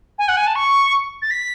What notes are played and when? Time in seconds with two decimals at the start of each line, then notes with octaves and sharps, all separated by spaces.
0.19 G#5
0.28 F#5
0.37 G#5
0.47 A5
0.55 C#6
1.22 A6
1.31 B6